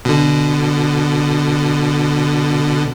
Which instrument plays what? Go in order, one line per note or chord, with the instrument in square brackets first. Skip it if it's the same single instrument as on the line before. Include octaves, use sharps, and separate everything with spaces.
[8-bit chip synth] B2 D3